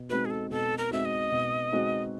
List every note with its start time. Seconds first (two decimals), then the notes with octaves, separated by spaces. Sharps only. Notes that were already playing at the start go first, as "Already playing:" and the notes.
Already playing: B2
0.10 G#3 C4 D#4 F#4 B4
0.25 G#4
0.30 A4
0.51 B2 A4
0.78 A#4
0.91 G#3 C4 D#4 F#4 E5
1.05 D#5
1.32 B2
1.72 G#3 C4 D#4 F#4